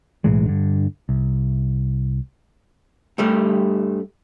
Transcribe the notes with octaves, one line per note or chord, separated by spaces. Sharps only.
B1 A2 E3 G#3
G2 D3
C2
G2 G3 A3